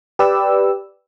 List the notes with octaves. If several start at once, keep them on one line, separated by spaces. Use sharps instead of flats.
G4 B4 D5 E6